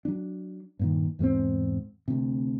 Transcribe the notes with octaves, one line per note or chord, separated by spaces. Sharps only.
F#3 D4
G2 A#2 D#3
E2 G#2 G3 C4
D2 C3